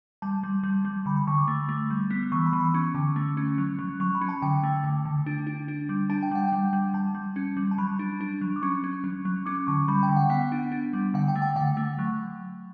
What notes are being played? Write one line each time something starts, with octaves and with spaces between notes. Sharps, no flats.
G3 A5
G3
G3
G3
D3 B5
B5
D3 C#6
D6
A3
A3
G3
B3
E3 C#6
B5
E3
B5
C#4 C#6
D3
A3
C#4
F#3
F#3
F#3 C#6
B5
C#4
A5
D3 G5
A3
D3
D3
D4
D4
D4
G3
D4 A5
G5
G3 F#5
G3 G5
G3
G3 A5
G3
C#4
G3
A5
F#3 B5
D4
D4
F#3
D6
C#4 C#6
C#4
F#3
F#3
C#4 D6
D3 C#6
G3 B5
G5
D3
F#5
B3 F#5
D4
D4
G3
D3 F#5
G5
A3
G5
D3 F#5
A3
F#3